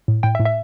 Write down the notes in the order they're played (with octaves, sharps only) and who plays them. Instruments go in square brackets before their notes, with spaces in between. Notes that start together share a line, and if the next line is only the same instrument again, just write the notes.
[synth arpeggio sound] A2
A2 G5
E5
A2
E5